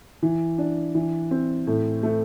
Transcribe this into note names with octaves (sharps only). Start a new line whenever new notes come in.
E3
D4
E3
C4
A2
A3